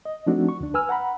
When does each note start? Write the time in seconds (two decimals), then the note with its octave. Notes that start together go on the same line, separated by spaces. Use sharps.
0.05 D#5
0.26 F3 A3 C4 D4 D#4 F#4
0.49 C#6
0.61 D2 D4
0.74 B4 G#5 E6 F6
0.89 F#5 A#5 B5